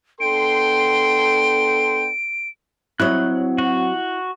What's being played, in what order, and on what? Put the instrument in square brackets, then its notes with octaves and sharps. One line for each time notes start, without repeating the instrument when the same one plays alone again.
[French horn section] B3 D4 A4 [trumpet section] G5 C6 [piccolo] D7
[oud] F#3 C#5 [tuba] C4 [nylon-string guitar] E4 D#5 [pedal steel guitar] F#6
[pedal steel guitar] F#4